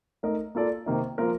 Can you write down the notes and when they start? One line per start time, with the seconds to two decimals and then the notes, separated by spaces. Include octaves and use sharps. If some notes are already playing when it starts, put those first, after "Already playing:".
0.23 A3 D#4 A#4 D#5
0.55 A#3 F4 A4 D5
0.86 C3 D#3 A#3 D#4
1.18 F3 A#3 F4 A#4